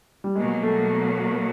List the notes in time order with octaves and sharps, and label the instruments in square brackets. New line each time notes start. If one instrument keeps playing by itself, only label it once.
[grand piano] G3
[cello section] B2 F#3 A#3 [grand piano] G#3
[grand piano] A3